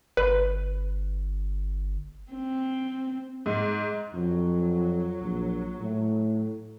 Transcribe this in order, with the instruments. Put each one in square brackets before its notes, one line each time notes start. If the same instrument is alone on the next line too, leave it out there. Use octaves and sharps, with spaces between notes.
[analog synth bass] G1 [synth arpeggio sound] B4
[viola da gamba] C4
[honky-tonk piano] G#2
[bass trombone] F2 [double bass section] F#3
[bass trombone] A#1
A2